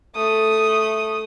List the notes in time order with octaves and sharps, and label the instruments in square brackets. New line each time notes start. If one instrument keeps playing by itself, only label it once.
[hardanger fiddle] A3 D#6